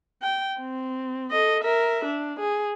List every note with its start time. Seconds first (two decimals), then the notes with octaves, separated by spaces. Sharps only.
0.23 G5
0.60 C4
1.31 A4 D#5
1.63 A#4 E5
2.05 D4
2.39 G#4